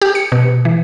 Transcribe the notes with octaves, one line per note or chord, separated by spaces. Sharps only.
G4
C#7
B2
E3